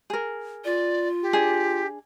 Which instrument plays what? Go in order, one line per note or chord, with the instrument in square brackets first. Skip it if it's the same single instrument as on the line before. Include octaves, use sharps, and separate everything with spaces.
[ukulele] G#4 A#4
[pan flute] F4 [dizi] D5
[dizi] G4
[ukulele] D4 G#4